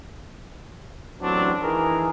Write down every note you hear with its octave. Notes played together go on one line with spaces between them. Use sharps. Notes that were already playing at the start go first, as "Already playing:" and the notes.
A1 F#3 C4 D4
D#3 E3 G#4 A#4